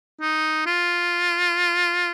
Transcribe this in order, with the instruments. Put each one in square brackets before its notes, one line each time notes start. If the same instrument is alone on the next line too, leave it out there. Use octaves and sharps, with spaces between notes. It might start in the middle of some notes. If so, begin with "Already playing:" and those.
[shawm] D#4
F4